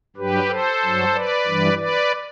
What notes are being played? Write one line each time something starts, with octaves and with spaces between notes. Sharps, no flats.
G2 F#3 G4 B4
A4 C5
G2 F#3
B4 D5
G2 E3 G3
B4 D5